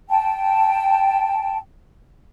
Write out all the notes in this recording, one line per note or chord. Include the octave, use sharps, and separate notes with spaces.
G5 A5